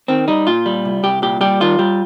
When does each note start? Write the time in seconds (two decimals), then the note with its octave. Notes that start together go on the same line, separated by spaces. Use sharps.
0.08 D#3 C4
0.28 G3 D#4
0.47 A#2 F4
0.66 G3
0.85 C2
1.03 C2 G4
1.22 A#2 G4
1.41 G3 G4
1.61 D#3 F4
1.79 G3